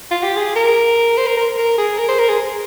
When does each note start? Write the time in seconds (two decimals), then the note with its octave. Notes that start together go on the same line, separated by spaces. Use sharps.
0.11 F4
0.23 G4
0.36 G#4
0.56 A#4
1.18 C5
1.27 A#4
1.37 A#4
1.58 A#4
1.78 G#4
1.99 A#4
2.09 C5
2.19 A#4
2.29 G#4